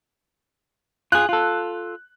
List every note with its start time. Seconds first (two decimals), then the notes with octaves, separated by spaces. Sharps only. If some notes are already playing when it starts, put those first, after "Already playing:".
1.12 F4 G#4 F#6
1.29 F4 A4